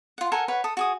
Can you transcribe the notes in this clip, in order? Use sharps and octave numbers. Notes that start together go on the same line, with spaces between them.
F4 F#5
A4 A#4 F#5 G#5
B4 C#5 F#5
A4 D#6
F#4 G#4 D#6